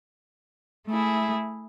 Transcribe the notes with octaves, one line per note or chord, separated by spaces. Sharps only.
A3 E4 G#4